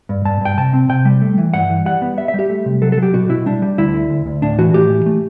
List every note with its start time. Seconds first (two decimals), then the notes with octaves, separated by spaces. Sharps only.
0.09 G2
0.25 G2 A5
0.41 G2 G5
0.57 C3 A5
0.73 C4
0.89 C3 G5
1.05 G3
1.22 A3
1.38 E3
1.54 G2 F#5
1.70 E3
1.86 G3 F#5
2.02 B3
2.17 G3 E5
2.28 E5
2.34 G3 G4
2.50 A3
2.66 C3
2.82 F#3 A4
2.92 A4
2.97 F#3
3.03 G4
3.14 B2 F#4
3.29 B2 E4
3.46 G3 D4
3.62 G3
3.78 D2 E4
3.94 D3
4.10 D2
4.26 D2
4.42 A2 D4
4.58 E3 F#4
4.74 A2 G4
4.90 E3
5.06 A3